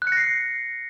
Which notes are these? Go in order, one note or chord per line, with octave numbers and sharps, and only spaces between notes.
F#6
C#7
A#6
C7